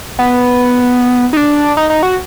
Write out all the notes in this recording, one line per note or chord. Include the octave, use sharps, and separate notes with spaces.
B3
D#4
D4
D#4
D#4
F#4